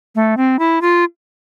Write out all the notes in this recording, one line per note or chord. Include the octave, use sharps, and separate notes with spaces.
A3
C4
E4
F4